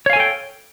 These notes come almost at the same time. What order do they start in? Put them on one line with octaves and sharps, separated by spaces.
C#5 F5 G#5 A4 G5